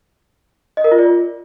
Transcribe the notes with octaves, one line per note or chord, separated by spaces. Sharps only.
D#5
A#4
F4
D5